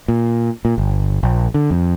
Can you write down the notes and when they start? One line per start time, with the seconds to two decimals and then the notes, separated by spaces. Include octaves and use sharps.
0.08 A#2
0.65 A#2
0.78 G1
1.23 A#1
1.54 D3
1.71 F2